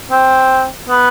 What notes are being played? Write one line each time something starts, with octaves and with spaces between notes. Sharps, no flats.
C4
B3